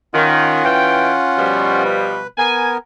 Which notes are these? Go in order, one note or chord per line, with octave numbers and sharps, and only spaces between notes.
D#3 C#4 F4 F#5
E3 G5
B2 F3 G3
B4
B3 A#4 G#5